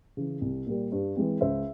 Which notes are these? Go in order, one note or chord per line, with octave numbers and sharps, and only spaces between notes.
C#3 E3
C2
A#2 G3 A#3
G2
E3 G#3 C4
C#2 C5 E5